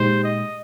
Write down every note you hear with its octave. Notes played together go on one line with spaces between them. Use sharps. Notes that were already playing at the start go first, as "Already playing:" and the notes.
Already playing: A#2 G#3 D#4 G4 C5
D#5